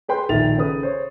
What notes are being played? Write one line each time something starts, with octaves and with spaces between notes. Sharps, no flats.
G#4 B4 G5 C6 G6
A#1 D#3 E5 A6 F7
C#3 A4 B4 D#6
C5 C#5